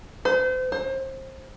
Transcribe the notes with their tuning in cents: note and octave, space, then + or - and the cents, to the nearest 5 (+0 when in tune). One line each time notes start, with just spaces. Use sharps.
C5 -35
C5 +30